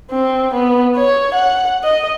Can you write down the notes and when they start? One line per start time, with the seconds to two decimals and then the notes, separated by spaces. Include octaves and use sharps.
0.11 C4
0.54 B3
0.96 C#5
1.34 F#5
1.84 D#5